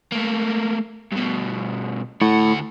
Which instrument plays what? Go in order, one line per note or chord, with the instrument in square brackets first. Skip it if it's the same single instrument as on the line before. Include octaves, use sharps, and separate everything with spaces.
[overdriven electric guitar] A3 A#3
G2 B2
[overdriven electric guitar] D2 F#5 [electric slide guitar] A2